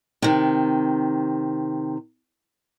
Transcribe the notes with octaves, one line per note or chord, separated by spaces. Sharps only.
C3 D#3